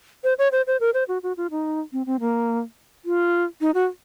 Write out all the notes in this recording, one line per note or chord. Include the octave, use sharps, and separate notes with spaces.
C5
C#5
C5
C5
A#4
C5
F#4
F#4
F4
D#4
C4
C4
A#3
F4
D#4
F#4